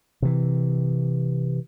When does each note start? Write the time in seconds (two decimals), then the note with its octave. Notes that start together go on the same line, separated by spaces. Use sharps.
0.22 C3 E3